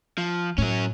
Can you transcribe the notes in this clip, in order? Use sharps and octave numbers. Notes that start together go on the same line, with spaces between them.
F3
A2 F#3 C#4